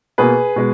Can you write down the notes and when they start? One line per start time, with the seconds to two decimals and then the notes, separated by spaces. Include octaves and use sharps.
0.18 B2 A#3 G#4 B4
0.56 B2 G#3